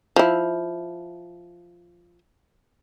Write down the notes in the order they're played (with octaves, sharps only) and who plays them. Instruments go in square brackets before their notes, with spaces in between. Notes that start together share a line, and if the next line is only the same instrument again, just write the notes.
[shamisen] F3 E4